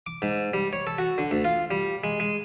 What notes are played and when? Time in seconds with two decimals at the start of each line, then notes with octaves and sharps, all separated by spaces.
0.06 D6
0.22 G#2
0.53 G3
0.73 C#5
0.87 A4
0.98 F#4
1.18 D3
1.31 D2
1.45 F4
1.71 G3
2.04 G#3
2.20 G#3